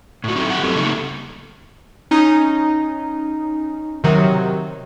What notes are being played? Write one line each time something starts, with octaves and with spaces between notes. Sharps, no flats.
A2 F#4
F#3 C4 D#4 E4 G4 A4
D3 G4 F#5
G2 F#3 A3 C4 E4 A4
C#3 G3 A3 A#3 D#4 A4
C#4 D#4
C3 D#3 F#3